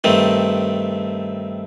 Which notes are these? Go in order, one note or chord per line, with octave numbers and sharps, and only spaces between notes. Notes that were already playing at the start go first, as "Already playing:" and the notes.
G2 D#3 A3 C4